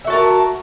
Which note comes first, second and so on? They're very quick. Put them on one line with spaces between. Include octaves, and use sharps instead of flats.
E5 F#4 A5 A#4